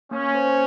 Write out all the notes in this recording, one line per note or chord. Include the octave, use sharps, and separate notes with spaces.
A#3 C#4
C5